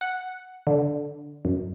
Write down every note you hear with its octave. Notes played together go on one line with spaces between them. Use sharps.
F#5
D3
F#2